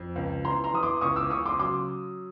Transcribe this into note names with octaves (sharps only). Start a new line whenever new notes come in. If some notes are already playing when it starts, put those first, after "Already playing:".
Already playing: F2
C#2
E3 A#5 C6
A#5 C6
E3 D#6
C6 D6
C#2 C#6 D#6
D6 E6
C#3 C#6 D#6
C6 D6
F#3 C6 D6